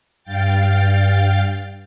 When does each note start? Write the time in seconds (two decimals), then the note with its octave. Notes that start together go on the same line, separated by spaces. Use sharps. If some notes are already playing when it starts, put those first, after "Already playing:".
0.24 G2 F5 G5 A6